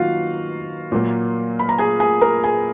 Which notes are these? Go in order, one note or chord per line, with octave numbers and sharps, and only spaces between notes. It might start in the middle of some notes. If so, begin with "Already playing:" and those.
Already playing: D#3 F#3 A#3 F4 F#4 F5
A#2 F#3 A#3
B5
A#5
G#4 G#5
G#4 G#5
A#4 A#5
G#4 G#5